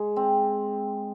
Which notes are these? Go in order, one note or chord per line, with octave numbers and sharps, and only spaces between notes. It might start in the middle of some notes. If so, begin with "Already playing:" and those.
Already playing: G#3
C4